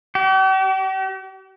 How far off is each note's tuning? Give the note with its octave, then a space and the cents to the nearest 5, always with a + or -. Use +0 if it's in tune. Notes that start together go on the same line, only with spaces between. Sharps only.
G4 -45